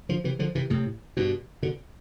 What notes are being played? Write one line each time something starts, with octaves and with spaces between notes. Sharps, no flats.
D3 F3
C3 E3
D3 F3
C3 E3
A2 C3
G2 B2
B2 D3